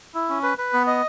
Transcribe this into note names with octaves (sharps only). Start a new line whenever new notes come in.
E4
C#4
B4
B4
B3
D#5